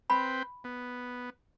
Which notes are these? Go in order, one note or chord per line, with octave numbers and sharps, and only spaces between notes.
C4 B4 G5 B5
B3